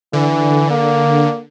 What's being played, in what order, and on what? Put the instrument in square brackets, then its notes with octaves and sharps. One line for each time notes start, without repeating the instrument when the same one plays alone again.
[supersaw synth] D3 [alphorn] E3
[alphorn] A#3